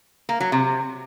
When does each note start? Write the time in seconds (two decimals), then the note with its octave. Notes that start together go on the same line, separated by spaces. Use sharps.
0.29 A#3
0.40 F#3
0.52 C3